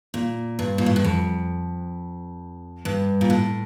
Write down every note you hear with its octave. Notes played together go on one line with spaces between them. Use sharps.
A#2
G2
A#2
A2
G2
F2
G2
A#2
A2